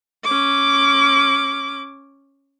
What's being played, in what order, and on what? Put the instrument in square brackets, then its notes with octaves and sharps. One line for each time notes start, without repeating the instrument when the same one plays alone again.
[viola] C#4 D6